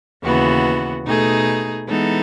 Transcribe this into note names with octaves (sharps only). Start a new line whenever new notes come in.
D#2 C#3 E3 B3 F#4
B2 A3 D#4 G#4
E3 G#3 B3 D#4 A4